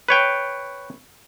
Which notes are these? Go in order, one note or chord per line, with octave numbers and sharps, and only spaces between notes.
B4 C#5 G5